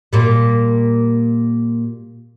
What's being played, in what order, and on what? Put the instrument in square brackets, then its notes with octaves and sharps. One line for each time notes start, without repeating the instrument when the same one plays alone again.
[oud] A#2 G3